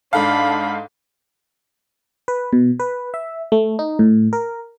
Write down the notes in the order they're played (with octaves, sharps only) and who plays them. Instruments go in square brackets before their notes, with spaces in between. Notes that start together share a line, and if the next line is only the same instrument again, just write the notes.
[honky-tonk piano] G#2 A4 F5 [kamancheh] D4 B5
[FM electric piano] B4
B2
B4
E5
A3
D#4
A2
A#4